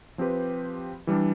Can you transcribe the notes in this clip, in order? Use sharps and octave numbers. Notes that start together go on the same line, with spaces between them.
F3 C4 G4 B4
E3 G3 D4